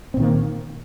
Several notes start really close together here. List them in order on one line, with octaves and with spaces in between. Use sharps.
C4 A#2 D#3 A#3